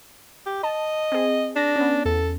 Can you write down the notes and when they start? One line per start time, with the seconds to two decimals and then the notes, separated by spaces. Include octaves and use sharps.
0.46 G4
0.63 D#5 A5
1.12 C4 G#4
1.56 D4 A#6
1.76 B3 C#4
2.05 E2 A4